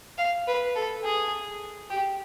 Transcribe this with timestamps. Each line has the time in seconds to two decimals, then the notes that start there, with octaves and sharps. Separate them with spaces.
0.18 F5
0.48 B4
0.75 A4
1.04 G#4
1.90 G4